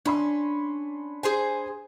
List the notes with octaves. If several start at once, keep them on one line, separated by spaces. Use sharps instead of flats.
C#4 D4 B5 C6
G#4 C5 G#5